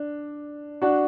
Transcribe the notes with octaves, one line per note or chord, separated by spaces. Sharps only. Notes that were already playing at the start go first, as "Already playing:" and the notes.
Already playing: D4
D4 F#4